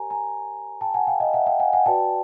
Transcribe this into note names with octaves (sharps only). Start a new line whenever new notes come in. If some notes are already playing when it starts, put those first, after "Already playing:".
Already playing: G4 A#4 C#5 G#5 A#5
G#5 A#5
G5 A5
F#5 G#5
F5 G5
D#5 F5
E5 F#5
F5 G5
F#5 G#5
F#5 G#5
F#4 B4 D5 G5 A5